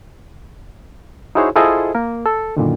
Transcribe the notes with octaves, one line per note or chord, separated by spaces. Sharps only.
D#4 E4 F#4 G#4 C5 C#5
E4 F4 G#4 A4 C5 D#5
A#3 A#4
A4
F#2 A#2 D3 D#3